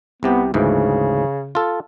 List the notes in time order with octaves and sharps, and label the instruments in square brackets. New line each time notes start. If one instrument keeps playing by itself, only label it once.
[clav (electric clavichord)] C2 C3 G4 [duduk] B3
[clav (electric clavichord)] D2 G#2 E3 [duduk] C#3
[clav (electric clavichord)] F4 A4